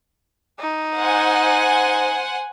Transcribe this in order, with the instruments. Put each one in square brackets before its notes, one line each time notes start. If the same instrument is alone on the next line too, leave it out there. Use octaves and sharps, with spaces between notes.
[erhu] D#4
[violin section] C5 F#5 G#5